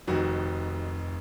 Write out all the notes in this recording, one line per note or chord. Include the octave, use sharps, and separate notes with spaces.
F1 F2 D#3 F#4